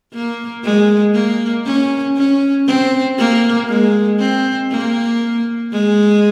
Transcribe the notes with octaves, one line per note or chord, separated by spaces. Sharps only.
A#3
G#3
A#3
C#4
C#4
C4
A#3
G#3
C4
A#3
G#3